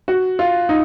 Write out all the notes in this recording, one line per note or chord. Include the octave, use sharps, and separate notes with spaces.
F#4
F4
D#4